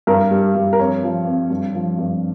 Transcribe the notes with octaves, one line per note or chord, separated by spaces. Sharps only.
G2 A#4
G3
G2
A#4
F2 C#5
F3
F2
G2
F3
G2